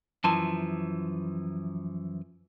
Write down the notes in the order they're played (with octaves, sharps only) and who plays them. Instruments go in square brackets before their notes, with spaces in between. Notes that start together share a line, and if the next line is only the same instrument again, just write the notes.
[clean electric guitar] F#2 E3 F3 [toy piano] A5 C6